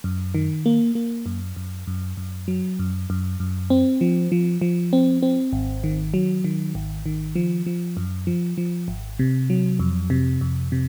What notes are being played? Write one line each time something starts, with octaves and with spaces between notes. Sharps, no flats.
F#2
D#3
A#3
A#3
F#2
F#2
F#2
F#2
F#3
F#2
F#2
F#2
C4
F3
F3
F3
C4
C4
G#1
D#3
F#3
D#3
G#1
D#3
F3
F3
F#2
F3
F3
G#1
C3
F#3
F2
C3
F2
C3